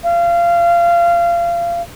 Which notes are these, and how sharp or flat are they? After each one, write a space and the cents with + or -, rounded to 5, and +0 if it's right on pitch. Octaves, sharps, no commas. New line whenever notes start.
F5 -25